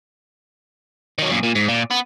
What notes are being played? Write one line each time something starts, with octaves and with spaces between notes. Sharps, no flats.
D#3 F#3
F#2 A#2
A#2
G#2
A#2
B3